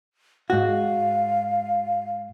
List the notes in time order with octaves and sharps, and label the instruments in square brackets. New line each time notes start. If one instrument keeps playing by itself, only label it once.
[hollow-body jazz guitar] G#2 F#4 [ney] F5